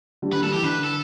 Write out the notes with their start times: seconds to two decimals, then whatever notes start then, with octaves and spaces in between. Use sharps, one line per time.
0.22 D3 G3
0.33 D3 B4
0.43 D3 G3 A4
0.53 E3 G4
0.63 D3 B4
0.84 A4